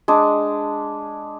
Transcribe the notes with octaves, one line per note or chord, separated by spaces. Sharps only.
G#3 D4